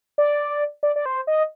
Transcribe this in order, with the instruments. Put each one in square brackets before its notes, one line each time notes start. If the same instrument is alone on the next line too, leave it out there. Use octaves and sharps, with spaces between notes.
[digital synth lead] D5
D5
D5
C5
D#5